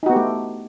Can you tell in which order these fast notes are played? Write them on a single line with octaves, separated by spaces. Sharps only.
D#4 F#4 B3 G4 A3